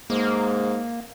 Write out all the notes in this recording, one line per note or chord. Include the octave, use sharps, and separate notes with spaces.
G#2 A#3